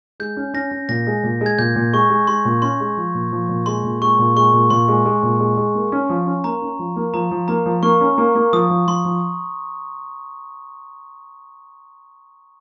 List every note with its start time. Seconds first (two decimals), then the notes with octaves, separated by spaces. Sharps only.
0.20 G#3 G6
0.37 C#4
0.54 C#4 A#6
0.71 C#4
0.89 A#2 A#6
1.07 G#3
1.23 A#2
1.41 G#3
1.46 G#6
1.58 A#2 G6
1.76 A#2
1.93 G#3 C#6
2.10 G#3
2.27 G#3 C6
2.45 A#2
2.62 C#4 C6
2.80 G#3
2.97 F3
3.14 A#2
3.32 F3
3.49 A#2
3.66 G#3 C6
3.84 A#2
4.01 G#3 C#6
4.19 A#2
4.36 G#3 C#6
4.53 A#2
4.70 A#2 C6
4.88 G#3
5.06 G#3
5.23 A#2
5.40 G#3
5.57 G#3
5.75 A#3
5.92 C#4
6.10 F3
6.27 C#4
6.44 A#3 A#5
6.62 C#4
6.79 F3
6.96 A#3
7.14 F3 A#5
7.31 F3
7.48 A#3 A#5
7.66 F3
7.83 A#3 C#6
8.01 C#4
8.18 A#3
8.35 A#3
8.53 F3 D#6
8.70 F3
8.87 F3 C6
9.05 F3